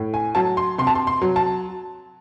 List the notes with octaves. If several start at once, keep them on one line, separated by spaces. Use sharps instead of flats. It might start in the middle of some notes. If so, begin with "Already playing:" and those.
Already playing: A2
G#5
F#3 A5
C6
C3 C6
A5
C6
C6
F#3
A5